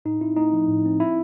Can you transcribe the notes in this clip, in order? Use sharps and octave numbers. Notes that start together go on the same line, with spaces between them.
A2 D#4
C4 E4
A3 D#4
F3
A2
C4
E4